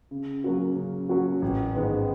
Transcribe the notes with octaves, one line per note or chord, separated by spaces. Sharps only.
C#3
F#3 A#3 C#4 F#4
C#3
F#3 A#3 C#4 F#4
A1
G#2 D#3 G#3 B3